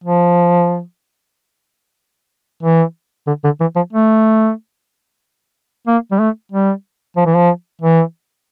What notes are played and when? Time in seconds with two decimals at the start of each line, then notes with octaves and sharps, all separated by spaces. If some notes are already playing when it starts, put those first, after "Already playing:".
0.04 F3
2.63 E3
3.27 D3
3.44 D3
3.61 E3
3.76 F3
3.93 A3
5.87 A#3
6.12 G3
6.19 A3
6.52 G3
7.17 F3
7.26 E3
7.36 F3
7.82 E3